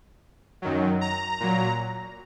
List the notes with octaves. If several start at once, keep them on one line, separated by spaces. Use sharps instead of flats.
F#2 D#3 F#3
A#5
A#2 F#3